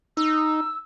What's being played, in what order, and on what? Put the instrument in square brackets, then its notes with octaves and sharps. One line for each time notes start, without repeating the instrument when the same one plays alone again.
[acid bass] D#4 [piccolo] E6